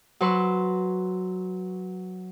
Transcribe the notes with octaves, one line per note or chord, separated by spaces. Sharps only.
F#3 B4 C6 C#6 E6